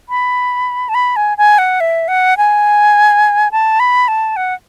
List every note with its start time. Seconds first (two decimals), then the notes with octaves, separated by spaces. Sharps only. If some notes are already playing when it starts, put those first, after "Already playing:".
0.09 B5
0.89 A5
0.95 B5
1.16 G#5
1.38 G#5
1.58 F#5
1.80 E5
2.08 F#5
2.38 G#5
3.52 A5
3.80 B5
4.08 A5
4.36 F#5